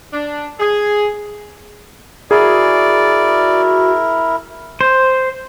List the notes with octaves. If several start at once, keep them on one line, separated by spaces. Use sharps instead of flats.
D4
G#4
E4 F#4 G#4 A#4 D5
C5